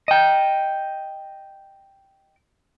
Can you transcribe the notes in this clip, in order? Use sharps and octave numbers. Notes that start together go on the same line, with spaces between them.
D#5 G5